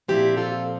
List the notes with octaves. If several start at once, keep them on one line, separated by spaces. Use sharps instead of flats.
A#2 F3 C4 E4 G4
F4 A4